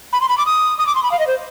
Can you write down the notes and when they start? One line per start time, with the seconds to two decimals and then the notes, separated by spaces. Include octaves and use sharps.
0.13 B5
0.21 C6
0.29 B5
0.38 D6
0.46 D#6
0.78 D#6
0.87 D6
0.95 C6
1.03 B5
1.12 F5
1.19 D#5
1.27 C5